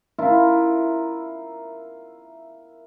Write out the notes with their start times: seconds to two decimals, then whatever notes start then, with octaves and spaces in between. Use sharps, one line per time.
0.18 E4 F4 A#4